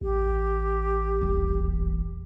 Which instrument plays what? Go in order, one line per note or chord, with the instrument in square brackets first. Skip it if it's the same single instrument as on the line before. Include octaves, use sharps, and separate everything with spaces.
[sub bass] A1 [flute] G4
[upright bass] D#1 E2